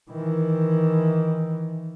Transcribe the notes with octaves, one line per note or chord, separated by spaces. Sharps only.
D#3 E3